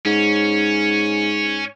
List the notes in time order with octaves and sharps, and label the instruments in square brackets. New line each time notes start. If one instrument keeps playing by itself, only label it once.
[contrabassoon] G#2 [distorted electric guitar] C#4